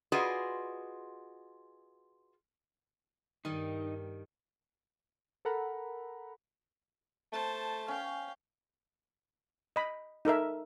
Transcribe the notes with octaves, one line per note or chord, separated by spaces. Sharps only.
F4 F#4 G#4 B4 D5 D#5
G2 D#3 G3 D#4
A4 A#4 F#5 A#5 B5
A3 C5 A5
C#4 F5 G5
D#5 B5
D#4 A4 A#4 E5